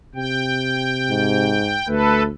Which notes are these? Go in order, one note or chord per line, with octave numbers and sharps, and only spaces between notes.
C3 G5
G#2
D2 A3 A4 B4